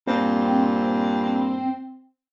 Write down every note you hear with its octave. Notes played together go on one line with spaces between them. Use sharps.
G2 A#2 C4